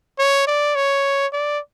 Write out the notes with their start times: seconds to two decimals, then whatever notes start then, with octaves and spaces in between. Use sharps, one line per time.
0.19 C#5
0.47 D5
0.75 C#5
1.33 D5